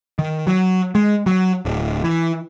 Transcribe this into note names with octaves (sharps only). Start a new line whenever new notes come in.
D#3
F#3
G#3
F#3
D1
E3